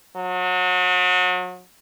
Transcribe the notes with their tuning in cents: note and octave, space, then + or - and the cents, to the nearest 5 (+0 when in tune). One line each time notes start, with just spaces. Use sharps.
F#3 -30